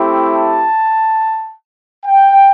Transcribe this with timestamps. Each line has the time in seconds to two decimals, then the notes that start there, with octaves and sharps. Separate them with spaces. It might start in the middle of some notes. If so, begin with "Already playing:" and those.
Already playing: A3 C4 E4 G4
0.35 A5
2.06 G5